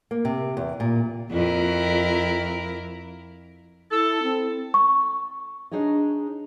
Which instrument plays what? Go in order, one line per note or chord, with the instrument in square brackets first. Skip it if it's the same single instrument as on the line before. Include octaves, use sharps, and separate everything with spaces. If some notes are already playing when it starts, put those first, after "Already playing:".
[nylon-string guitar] A#3
C3
E2
A#2
[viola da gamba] F2 E4 A#4
[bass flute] E4 [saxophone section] A4
[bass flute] C4
[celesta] C#6
[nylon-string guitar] D4 D#4 G#4 C#5 D#5